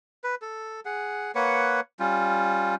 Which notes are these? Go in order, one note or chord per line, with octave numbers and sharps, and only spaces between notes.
B4
A4
G#4 F#5
A#3 B4 C#5 F#5
G3 C#4 F4